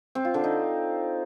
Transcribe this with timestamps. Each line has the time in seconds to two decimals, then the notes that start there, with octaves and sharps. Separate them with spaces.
0.15 C4
0.25 F4
0.34 D3
0.44 D#4